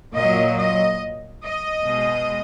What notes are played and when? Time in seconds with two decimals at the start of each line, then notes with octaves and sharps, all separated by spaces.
0.15 A#2 F#3 D#5
0.58 D#5
1.44 D#5
1.86 B2 G#3